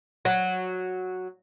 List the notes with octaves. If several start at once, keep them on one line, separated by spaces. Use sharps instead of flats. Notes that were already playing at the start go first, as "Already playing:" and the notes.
F#3